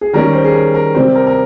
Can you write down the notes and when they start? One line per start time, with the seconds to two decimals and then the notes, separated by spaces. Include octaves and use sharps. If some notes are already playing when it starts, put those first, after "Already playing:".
0.01 G#4
0.13 D#3 G3 C#4 A#4
0.33 C5
0.44 G#4
0.55 A#4
0.74 A#4
0.95 C3 G3 C4 C5
1.15 A#4
1.27 A#4